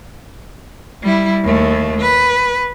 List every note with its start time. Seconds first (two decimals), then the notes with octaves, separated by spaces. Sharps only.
1.02 G3 E4
1.44 D#2 A3
2.00 B4